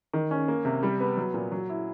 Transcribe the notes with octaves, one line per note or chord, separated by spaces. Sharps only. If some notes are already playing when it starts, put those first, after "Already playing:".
D#3
C#4
A#3
C3
G3
B3
F#3
A#2
F#3
E4